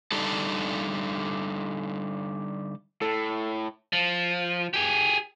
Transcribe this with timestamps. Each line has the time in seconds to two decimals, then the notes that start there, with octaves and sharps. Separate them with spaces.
0.12 D3 G3 D#4 A4
3.01 A2 A4
3.93 F3
4.74 G4 G#4